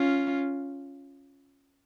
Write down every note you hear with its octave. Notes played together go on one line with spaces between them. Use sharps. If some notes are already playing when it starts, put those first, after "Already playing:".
Already playing: C#4 F4